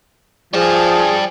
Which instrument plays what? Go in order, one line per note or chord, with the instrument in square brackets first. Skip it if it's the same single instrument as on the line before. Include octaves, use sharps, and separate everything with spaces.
[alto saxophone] F3 [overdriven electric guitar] G3 A5 [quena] G#4